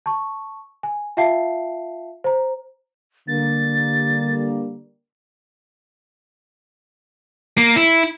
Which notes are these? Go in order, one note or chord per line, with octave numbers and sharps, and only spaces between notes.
A5 C#6
G#5
F4 E5 F5 G5 A5 C7
C5 A#5
D3 G3 A#3 A6
A#3
E4